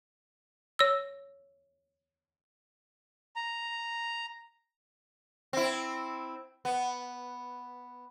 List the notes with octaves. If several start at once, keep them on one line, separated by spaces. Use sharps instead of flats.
C#5 E6
A#5
C4 E4
B3